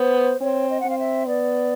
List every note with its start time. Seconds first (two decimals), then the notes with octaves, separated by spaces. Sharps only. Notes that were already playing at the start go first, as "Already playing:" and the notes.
Already playing: B3 C5
0.41 C4 C#5
0.70 D#5
0.80 F#5
0.84 C4
0.90 F5
0.99 E5
1.27 B3 D5